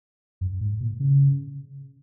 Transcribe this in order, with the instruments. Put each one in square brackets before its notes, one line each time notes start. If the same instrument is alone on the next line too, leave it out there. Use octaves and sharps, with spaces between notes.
[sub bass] F#2
G#2
A#2
C#3